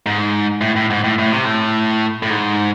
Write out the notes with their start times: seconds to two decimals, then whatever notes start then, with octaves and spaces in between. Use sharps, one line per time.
0.06 G#2
0.61 A2
0.76 A2
0.90 G#2
1.04 A2
1.18 A2
1.32 C3
1.44 A2
2.23 A2
2.30 G#2